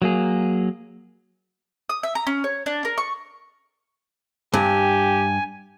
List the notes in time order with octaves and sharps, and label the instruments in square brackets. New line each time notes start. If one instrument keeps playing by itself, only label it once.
[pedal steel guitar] F#3 A#3 G#4
[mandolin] D#6
E5
A#5
C#4
C#5
D4
A#4
C#6
[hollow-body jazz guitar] G2 [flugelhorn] G4 [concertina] G#5